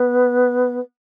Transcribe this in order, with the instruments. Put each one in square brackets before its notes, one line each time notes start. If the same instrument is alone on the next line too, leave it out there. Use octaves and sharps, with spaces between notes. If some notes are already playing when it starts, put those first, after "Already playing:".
Already playing: [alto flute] B3